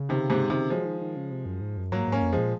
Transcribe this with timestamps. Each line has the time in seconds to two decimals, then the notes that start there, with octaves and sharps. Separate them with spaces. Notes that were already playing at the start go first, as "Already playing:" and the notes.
Already playing: C#3
0.09 C3 D#3
0.30 G#2 C3
0.50 C3 D#3
0.70 F3 F#3 G#3
0.85 D#3
1.01 D#3
1.16 C#3
1.31 C3
1.46 F#2
1.61 G#2
1.77 F#2
1.92 G#2 F#3 A#3
2.08 G#2 A#3 C#4
2.22 F2
2.33 F3 G#3
2.38 A#2